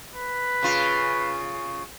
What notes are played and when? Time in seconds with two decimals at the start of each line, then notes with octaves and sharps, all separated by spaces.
0.15 B4
0.63 C#3 F4